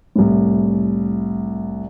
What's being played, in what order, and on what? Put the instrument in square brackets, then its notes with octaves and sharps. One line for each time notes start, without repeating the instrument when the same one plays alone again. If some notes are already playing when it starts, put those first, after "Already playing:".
[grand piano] C2 A2